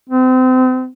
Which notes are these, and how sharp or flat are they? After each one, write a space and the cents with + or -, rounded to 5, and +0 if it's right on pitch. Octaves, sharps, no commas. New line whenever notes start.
C4 -35